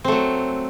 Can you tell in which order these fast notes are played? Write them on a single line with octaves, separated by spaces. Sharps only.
C4 A3 F#3